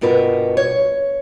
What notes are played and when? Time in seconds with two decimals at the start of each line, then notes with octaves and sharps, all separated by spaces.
0.01 G2 B2 F4 A#4 B4
0.57 C#5